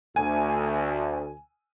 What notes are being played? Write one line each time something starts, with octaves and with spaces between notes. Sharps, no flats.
D2 G#5